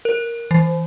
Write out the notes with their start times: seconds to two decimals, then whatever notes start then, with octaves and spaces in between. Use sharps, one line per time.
0.05 A#4
0.51 E3